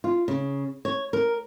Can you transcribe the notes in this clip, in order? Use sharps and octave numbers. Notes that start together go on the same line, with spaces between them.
F4
C#3
C#5
A#4